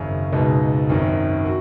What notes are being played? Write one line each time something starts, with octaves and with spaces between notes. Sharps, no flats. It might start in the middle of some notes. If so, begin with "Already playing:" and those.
Already playing: G#1 F#2 C#3
C#2 B2 G#3 D#4
G#1 F#2 D#3
F#4